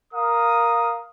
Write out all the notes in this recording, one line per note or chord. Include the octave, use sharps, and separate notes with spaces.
A#4 F5 D#6